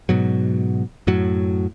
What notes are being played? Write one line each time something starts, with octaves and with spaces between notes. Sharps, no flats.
G#2 B2 F#3
F#2 A2 F#3